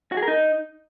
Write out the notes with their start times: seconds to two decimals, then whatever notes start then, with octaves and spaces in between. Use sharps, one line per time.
0.12 F#4
0.17 G#4
0.22 A#4
0.28 D#4